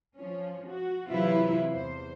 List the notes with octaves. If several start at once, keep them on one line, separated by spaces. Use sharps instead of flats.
F3 C#4
F#4
C3 E3 F#3 E4 F4 B4
E2 C5